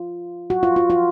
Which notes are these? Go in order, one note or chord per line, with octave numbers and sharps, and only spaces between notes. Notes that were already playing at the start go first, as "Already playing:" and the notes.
Already playing: F4
F#4
F4
F4
F4